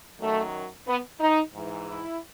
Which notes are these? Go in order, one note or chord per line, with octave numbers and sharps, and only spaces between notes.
F#2 D#3 F#3 A3
B3
D#4
G#2 E3
E4